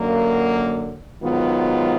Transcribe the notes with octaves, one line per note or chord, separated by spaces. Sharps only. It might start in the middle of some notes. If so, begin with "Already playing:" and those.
Already playing: F#2 D3 F#3 A#3
G#2 D#3 F#3 B3 F4